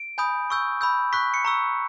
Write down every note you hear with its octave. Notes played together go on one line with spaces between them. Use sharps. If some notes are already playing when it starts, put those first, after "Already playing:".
Already playing: D7
G#5 B5 D#6 G6
C#6 E6 G6
B5 E6 G6
C#6 F#6 B6
C#7
A#5 C#6 E6